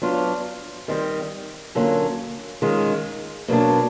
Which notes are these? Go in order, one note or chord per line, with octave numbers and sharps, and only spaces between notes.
F#3 B3 D4 F4
D#3 G3 C4
D3 F#3 A#3 C#4 F4
D#3 G#3 C#4 F4
B2 F#3 A#3 D4